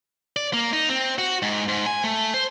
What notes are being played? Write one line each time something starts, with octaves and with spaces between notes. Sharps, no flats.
D5
A#3
D#4
C4
F#4
G#2
G#2
G#5
A3
C5